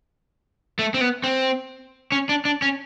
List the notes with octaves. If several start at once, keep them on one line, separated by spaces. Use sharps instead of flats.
A3
C4
B3
C4
C#4
D4
D4
C#4